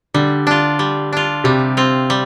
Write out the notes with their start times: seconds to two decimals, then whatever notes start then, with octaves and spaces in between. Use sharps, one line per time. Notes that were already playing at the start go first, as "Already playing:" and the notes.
0.14 D3 G3
0.47 D4 F4
0.79 G3
1.13 D4 F4
1.44 C3 G3
1.77 C4 F4
2.10 G3